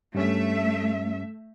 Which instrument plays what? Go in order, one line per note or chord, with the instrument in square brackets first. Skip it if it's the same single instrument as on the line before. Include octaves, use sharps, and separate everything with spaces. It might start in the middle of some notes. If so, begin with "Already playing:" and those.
[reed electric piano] G2 G3 C#4 [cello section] A3 E5